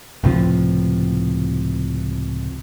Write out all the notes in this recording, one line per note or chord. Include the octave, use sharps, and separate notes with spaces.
C#2 A2 C3 F3